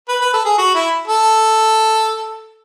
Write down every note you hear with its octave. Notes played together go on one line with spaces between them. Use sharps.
B4
B4
A4
G#4
F#4
E4
A4